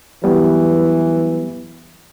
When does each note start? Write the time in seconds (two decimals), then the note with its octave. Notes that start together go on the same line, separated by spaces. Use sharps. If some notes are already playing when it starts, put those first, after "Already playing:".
0.24 E3 F#3 G3 B3